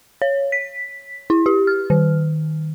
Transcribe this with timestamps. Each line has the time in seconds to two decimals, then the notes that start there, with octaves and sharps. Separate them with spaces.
0.22 C#5
0.52 B6
1.30 E4
1.46 G4
1.67 F6
1.90 D#3